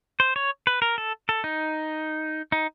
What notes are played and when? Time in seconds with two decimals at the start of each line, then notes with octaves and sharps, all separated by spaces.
0.20 C5
0.36 C#5
0.67 B4
0.82 A#4
0.98 A4
1.29 A4
1.44 D#4
2.52 D#4